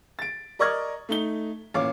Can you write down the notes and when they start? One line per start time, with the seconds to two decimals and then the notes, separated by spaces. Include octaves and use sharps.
0.19 A6 D7
0.59 A#4 D5 D#5 C#6 F6 G#6
1.09 A3 D#4 G7
1.74 A1 A#2 C#5 F5 D6